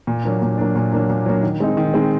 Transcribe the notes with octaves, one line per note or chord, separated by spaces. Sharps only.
A#2
F#3 A#3 D4
A#2
F#3 A#3 D4
A#2
F#3 A#3 D4
A#2
F#3 A#3 D4
D#3
G#3 C4 D#4
D#3
G#3 C4 D#4